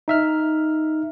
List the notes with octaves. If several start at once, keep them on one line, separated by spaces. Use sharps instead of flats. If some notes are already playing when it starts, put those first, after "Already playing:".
D#4 E5 F6